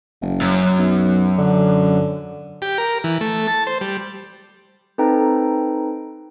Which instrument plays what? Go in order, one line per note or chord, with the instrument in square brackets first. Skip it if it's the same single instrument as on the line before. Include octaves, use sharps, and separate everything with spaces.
[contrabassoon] F#1
[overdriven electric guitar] F#2
[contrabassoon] B1
D3
[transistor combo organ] G4
A#4
E3
A3
A5
C5
G3
[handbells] C4 D#4 A4 B4 G5 A#5